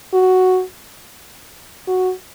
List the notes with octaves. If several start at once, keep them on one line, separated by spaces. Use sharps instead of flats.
F#4
F#4